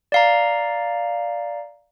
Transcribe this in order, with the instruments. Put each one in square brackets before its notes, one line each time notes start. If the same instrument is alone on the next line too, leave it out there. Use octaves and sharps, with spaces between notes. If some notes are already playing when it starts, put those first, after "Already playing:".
[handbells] D5 F5 A#5